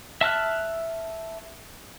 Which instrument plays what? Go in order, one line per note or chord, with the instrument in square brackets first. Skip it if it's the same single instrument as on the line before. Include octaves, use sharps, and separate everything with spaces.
[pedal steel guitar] E5 A5 F6 F#6